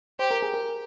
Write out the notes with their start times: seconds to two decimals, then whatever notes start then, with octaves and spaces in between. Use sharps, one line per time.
0.19 G4 C5
0.31 A#4
0.42 G#4
0.54 A#4